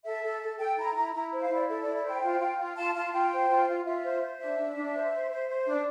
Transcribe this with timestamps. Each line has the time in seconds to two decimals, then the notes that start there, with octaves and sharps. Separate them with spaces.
0.05 A4 E5
0.23 A4
0.42 A4
0.59 A4 G5
0.77 E4 A#5
0.96 E4 A#5
1.14 E4 A#5
1.32 C5
1.41 F5
1.50 E4 D5
1.68 A4 E5
1.82 D5
1.86 E4
1.96 D5
2.04 C5 G5
2.22 F4
2.40 F4
2.58 F4
2.77 F4 A5
2.95 F4 A5
3.13 F4 G5
3.32 C5
3.50 F4
3.68 F4
3.85 F4 E5
4.04 C5
4.22 C5
4.40 D4 E5
4.58 D4
4.76 D4
4.95 C5
5.12 C5
5.31 C5
5.48 C5
5.67 D4